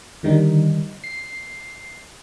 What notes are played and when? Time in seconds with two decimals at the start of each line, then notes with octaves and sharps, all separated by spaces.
0.23 D3 D#3 G3 D#4
1.04 C7